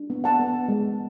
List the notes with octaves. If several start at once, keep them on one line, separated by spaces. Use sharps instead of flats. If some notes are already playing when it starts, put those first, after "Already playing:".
Already playing: D4
B3
F#5 A5
B3
G#3